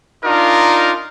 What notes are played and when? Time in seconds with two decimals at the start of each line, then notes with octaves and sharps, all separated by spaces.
0.24 D4 D#4 F4 A#4